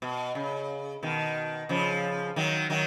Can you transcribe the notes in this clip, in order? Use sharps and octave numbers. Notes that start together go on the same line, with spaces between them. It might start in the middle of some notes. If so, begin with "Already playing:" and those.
B2
C#3
B2 D#3
C#3 F3
D#3 F#3
D#3 F#3